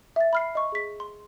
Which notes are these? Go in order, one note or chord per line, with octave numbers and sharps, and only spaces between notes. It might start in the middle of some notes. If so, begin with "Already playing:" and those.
E5 A6
B5 F6 C7
D#5 C#6
G#4 B6
C6